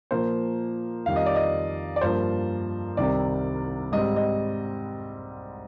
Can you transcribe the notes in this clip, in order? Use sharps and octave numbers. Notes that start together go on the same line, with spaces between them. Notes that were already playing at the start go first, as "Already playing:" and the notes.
A#2 F3 A#3 C5
F2 D#3 G3 F5
D#5
D5
D#5
D5
G2 F3 A#3 C5
C2 C3 D#3 G3 C4 D5
G#2 G3 C4 D#5
D#5